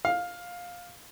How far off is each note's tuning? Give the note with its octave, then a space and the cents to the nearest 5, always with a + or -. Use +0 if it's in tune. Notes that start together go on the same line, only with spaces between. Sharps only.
F5 +15